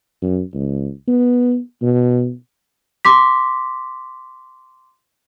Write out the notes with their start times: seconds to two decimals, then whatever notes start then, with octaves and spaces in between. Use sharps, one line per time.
0.22 F#2
0.54 C#2
1.08 B3
1.82 B2
3.05 C6 D6 B6